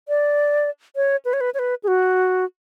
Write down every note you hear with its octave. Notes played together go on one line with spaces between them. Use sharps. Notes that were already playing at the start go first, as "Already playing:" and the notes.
D5
C#5
B4
C#5
B4
C#5
B4
G#4
F#4